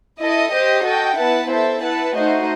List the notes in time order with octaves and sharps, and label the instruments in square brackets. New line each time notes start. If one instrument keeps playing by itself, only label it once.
[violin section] E4 A4 D#5
G4 C5 D#5
F#4 A4 D#5 G5
B3 E4 B4 F#5 A5
E4 A4 C5 E5
E4 B4 F#5 A5
A3 D#4 F#4 C5 D#5